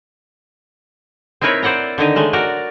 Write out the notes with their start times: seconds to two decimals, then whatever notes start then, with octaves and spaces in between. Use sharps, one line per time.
1.41 C4 D#4 E4 A#4 B4 C#5
1.63 C5 D5 F#5 G5 A#5
1.98 D3 D#3 D#4 D#5
2.16 G#3 A3 C#4
2.33 F#4 A#4 D5